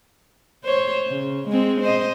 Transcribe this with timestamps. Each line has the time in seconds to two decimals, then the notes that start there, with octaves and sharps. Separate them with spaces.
0.64 C5 C#5
1.07 C#3
1.48 G#3 C4
1.81 C5 D#5